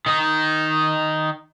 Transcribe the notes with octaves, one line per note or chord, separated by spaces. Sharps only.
D#3 D#4